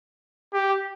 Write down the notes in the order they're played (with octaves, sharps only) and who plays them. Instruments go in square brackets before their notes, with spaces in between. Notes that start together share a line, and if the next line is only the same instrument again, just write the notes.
[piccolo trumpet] G4